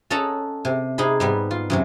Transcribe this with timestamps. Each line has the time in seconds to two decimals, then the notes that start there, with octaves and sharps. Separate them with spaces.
0.10 C#4 A4 D#5 F#5 A5 A#5
0.65 C3
0.98 C3 D#4 G#4 B5
1.20 G#2 G3 B3
1.51 F4
1.70 F#2 C3 F#3